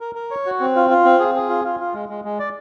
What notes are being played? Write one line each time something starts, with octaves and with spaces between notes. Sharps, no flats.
A#4
A#4
C#5
F#4
C4
F4
F4
C4
G#4
G#4
F4
F4
F4
G#3
G#3
G#3
D5